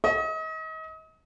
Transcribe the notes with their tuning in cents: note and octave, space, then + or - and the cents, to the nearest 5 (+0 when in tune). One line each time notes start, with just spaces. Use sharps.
D#5 +35